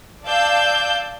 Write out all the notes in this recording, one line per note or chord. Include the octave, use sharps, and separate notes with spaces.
D5 F5 A5 E6 G6